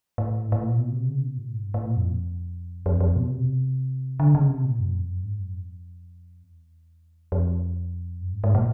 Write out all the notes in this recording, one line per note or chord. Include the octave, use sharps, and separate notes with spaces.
A2
A2
A#2
B2
C3
C#3
B2
A2
G#2
G2
A2
A#2
F2
F2
F2
B2
C3
D3
C#3
C3
A#2
F#2
F2
F#2
G#2
F#2
F2
E2
F2
F#2
G#2
G#2
A#2